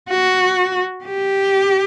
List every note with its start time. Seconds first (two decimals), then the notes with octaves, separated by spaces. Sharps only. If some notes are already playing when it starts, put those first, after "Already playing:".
0.10 F#4
1.05 G4